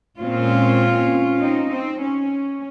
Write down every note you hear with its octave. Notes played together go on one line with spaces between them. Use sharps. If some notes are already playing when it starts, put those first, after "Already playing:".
A#2 G#3 C4 C#4 F4
C4 D#4
C4
C#4